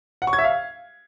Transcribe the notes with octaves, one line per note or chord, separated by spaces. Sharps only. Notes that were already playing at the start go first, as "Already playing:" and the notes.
F#5
C#6
G#6
E5
F5